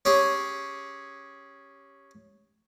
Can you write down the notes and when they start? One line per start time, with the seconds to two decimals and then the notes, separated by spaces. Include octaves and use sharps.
0.05 C#4 G4 G#4 C#5